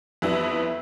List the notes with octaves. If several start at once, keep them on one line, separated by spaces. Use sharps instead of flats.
F2 E3 G3 B3 E4